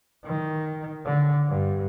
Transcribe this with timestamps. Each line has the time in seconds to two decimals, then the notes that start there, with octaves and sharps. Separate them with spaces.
0.25 D#3
1.05 D3
1.48 G2